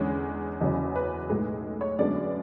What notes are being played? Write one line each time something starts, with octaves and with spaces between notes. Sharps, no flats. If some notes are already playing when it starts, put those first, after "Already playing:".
Already playing: E2 D3 G#3 C#4
F#1 E2 C#3 F#3
B4
B1 A2 G#3
C#5
F#2 D3 G#3 B3 D4 D5